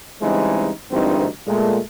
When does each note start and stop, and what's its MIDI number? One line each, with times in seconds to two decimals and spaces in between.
0.22 0.71 49
0.22 0.71 52
0.22 0.71 55
0.22 0.71 56
0.22 0.71 60
0.22 0.71 63
0.91 1.26 32
0.91 1.26 38
0.91 1.26 43
0.91 1.26 52
0.91 1.26 60
0.91 1.26 63
1.47 1.79 46
1.47 1.79 56
1.47 1.79 57